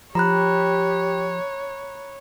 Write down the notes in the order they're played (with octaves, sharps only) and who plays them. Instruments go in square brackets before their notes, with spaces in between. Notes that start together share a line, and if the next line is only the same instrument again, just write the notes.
[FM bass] F3 [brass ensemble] G4 [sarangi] C#5 [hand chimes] A#5 B5 F#6